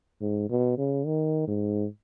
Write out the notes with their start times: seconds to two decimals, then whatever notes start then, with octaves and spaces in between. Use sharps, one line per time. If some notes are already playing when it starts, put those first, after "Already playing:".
0.21 G#2
0.50 B2
0.78 C#3
1.06 D#3
1.48 G#2